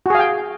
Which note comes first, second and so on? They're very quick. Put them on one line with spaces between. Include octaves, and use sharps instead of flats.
F#4 G#4 F5 G5